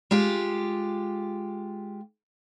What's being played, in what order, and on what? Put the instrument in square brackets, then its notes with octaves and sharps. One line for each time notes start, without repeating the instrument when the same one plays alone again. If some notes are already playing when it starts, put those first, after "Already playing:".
[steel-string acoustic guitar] G#3 F4 G4